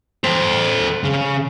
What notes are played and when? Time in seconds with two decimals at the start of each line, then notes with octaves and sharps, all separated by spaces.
0.24 A4 C5
1.03 C#3